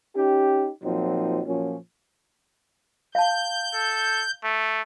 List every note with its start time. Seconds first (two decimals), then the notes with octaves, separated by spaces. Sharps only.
0.15 C#4 D#4 G4
0.83 A#2 F3 F#3 C4 D#4
1.46 A#2 F3 F#3 C#4
3.15 F5 A5 G6
3.74 A4
4.43 A3